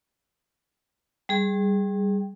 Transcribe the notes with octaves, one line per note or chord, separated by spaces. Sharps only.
G3 G#4